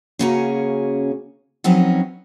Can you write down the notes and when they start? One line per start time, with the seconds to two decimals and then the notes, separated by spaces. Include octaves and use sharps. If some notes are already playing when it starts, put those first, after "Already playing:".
0.19 C#3 A#3 C#4 F#4 G#4 A#5
1.64 F3 F#3 C4 C#4 D#4 B4